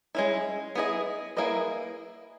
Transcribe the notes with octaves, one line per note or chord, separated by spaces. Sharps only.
G#3 C#4 E4
B3 E4 G#4 D#5
A#3 E4 G#4 B4 D#5